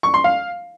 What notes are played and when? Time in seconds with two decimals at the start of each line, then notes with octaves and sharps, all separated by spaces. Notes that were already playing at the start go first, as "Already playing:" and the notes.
0.03 C#6
0.14 C6
0.24 F5